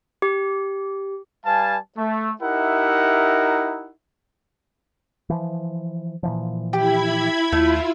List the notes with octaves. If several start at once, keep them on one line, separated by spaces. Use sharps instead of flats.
G4
G3 B4 F5 G#5 A5
A3
D#4 E4 G4 A#4 E5 F#5
E3 F3
A#2 E3 F3
E4 G4 B5 G#6
D#2 A3 E4 F4